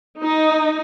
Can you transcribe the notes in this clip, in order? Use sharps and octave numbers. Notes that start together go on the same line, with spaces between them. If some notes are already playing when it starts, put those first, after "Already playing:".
D#4